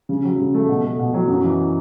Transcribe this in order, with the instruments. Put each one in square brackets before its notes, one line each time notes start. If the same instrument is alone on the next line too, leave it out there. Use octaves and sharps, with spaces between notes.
[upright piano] C#3
F#3
C#3
A3
B2
A3
B2
F#3
F#2
E3